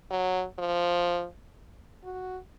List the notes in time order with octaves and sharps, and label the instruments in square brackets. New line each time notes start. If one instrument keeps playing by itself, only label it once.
[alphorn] F#3
F3
F#4